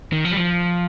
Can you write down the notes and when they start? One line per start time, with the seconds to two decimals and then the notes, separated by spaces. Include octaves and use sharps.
0.12 D#3
0.25 F3
0.31 G3
0.37 F3